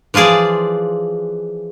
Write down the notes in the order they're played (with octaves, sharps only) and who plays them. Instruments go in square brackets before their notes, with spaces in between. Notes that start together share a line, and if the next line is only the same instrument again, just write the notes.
[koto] E3 F3 F4 G#4 D5